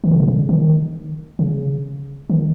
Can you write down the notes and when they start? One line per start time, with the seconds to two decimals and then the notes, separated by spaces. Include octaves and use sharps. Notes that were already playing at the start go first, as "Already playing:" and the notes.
0.04 D#3
0.11 C#3
0.20 C3
0.28 C#3
0.49 D#3
1.39 C#3
2.30 D#3